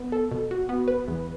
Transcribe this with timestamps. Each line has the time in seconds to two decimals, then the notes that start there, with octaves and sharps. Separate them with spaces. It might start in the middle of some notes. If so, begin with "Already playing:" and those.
Already playing: B3
0.12 A4
0.31 B2
0.51 F#4
0.69 B3
0.88 B4
1.08 E2